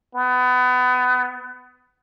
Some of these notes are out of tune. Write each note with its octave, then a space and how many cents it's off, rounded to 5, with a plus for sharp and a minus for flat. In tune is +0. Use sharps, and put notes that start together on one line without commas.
B3 +25